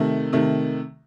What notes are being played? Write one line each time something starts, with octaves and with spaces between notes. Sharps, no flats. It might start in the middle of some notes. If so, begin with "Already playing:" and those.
Already playing: C3 D#3 A3
C3 D#3 A3